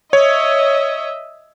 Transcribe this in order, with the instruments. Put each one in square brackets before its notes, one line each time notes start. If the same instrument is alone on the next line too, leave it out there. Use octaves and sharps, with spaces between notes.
[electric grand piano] C#5 [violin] D#5 E5